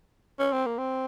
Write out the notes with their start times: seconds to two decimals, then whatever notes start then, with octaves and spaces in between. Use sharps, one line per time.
0.39 C#4
0.52 C4
0.66 A#3
0.78 C4